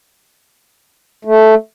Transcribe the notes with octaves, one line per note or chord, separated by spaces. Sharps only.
A3